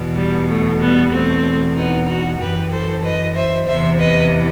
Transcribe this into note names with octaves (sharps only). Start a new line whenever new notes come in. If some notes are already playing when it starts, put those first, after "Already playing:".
Already playing: E2 B2
G3
A3
G3 B3
E2 B2 A3 C4
B3 D#4
D#4 F#4
F#2 E3 G4 B4
A4 C5
B4 D#5
C5 E5
E2 C3 E3 C5 E5
B4 D#5